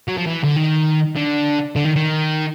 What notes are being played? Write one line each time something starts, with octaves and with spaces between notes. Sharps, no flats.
F#3
F3
E3
D3
D#3
D3
D3
D#3
D#3